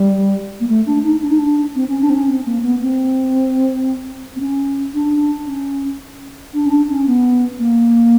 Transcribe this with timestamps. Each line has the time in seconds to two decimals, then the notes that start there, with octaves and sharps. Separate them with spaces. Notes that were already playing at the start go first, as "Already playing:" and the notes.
Already playing: G3
0.60 A#3
0.68 A3
0.86 D4
1.03 D#4
1.22 D4
1.30 D#4
1.38 D4
1.75 C4
1.88 C#4
2.01 D4
2.10 C4
2.15 C#4
2.28 C4
2.46 A#3
2.63 B3
2.82 C4
4.36 C4
4.40 C#4
4.94 D4
5.47 C#4
6.54 D4
6.66 C#4
6.70 D4
6.89 C#4
7.07 B3
7.59 A#3